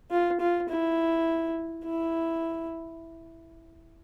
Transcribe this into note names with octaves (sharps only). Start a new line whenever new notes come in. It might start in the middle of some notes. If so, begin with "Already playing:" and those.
F4
F4
E4
E4